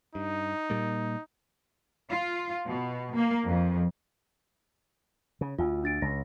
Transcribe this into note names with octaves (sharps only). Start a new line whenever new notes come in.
G2 D#4
A#2 G3 A#3
F4
B2
A#3
F2
C#3
D2 F4
D4 A6 D7
C#2 A#6